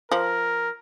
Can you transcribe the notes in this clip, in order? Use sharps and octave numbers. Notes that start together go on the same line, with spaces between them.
F3 A#4